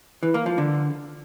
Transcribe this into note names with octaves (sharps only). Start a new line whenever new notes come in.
E3
A#3
F3
D3